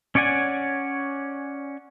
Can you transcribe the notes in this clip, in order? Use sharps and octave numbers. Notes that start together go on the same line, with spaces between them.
C#4 C#5 D5 F#5 G#5